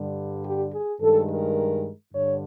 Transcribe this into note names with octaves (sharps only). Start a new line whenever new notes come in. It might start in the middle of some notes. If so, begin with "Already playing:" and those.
Already playing: G2 D3 G3
G4
G#4
G2 D#3 G#3 A4
A#4
G2 D3 C#5